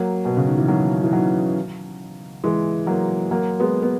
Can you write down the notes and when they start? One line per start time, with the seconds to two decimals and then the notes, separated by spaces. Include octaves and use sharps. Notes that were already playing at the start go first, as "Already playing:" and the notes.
Already playing: F#3 A#3
0.25 B2
0.37 C#3
0.47 D#3
0.58 E3
0.68 D#3 F#3
1.03 E3
1.12 D#3 F#3
2.44 E3 G#3
2.86 F#3 A#3
3.31 F#3 A#3
3.60 G#3 B3
3.83 B3